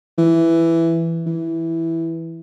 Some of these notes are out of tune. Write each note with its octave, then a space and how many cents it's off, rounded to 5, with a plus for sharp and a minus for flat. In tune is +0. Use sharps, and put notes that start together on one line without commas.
E3 +5
E3 -5